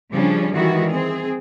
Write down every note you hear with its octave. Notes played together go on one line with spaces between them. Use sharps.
C#3 F3 G3 C#4 D4
D#3 E3 G3 G#3 E4 F#4
C4 G#4